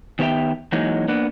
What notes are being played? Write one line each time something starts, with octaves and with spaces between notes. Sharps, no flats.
D#3 B3 G4 A#4 E5 G5
E3 F#3 G#3 A#3 D#4
A#3 B3 D4